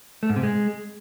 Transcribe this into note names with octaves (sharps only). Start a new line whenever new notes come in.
A3
G#2
C3
G#3